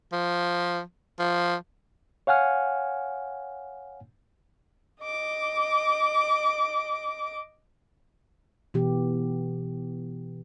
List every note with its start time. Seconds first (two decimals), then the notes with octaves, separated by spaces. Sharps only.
0.12 F3
1.19 F3
2.27 C#5 F5 F#5 G#5 F6
5.02 D#5 D6
8.74 B2 E3 B3 G4